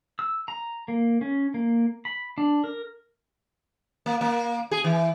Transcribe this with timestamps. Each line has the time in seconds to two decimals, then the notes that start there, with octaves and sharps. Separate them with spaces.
0.19 E6
0.48 A#5
0.88 A#3
1.21 C#4
1.54 A#3
2.05 B5
2.38 D4
2.64 A#4
4.06 A#3
4.21 A#3
4.71 G#4
4.84 E3